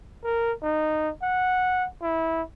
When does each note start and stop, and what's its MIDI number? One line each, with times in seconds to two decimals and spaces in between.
0.24 0.53 70
0.63 1.11 63
1.23 1.87 78
2.02 2.42 64